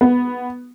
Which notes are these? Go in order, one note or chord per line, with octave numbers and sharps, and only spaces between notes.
B3